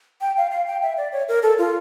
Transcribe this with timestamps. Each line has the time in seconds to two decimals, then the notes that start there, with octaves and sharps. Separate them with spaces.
0.21 G5
0.37 F5
0.51 F5
0.67 G5
0.82 E5
0.97 D5
1.12 C#5
1.28 A#4
1.43 A4
1.58 F4